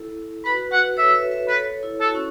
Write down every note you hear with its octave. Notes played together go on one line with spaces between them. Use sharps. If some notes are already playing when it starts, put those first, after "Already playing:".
Already playing: E4 A4
F#4 B4 B5
F#4 B4 F#5
A4 C#5 E5
B4 E5
B4 E5
A4 B4 C#5
E4 A4
F#4 A4
E4
C#4 F#4